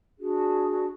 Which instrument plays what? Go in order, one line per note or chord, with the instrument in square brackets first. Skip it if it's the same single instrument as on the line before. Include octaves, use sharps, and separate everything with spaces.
[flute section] D4 F#4 G#4